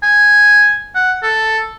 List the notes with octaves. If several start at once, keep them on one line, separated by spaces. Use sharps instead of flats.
G#5
F#5
A4